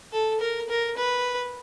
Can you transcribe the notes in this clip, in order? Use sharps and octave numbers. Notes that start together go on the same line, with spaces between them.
A4
A#4
A#4
B4